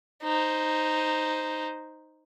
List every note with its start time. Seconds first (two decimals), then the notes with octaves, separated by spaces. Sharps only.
0.23 D#4 C5